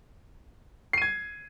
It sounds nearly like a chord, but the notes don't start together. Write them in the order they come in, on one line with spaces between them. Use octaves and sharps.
C7 D#7 G#6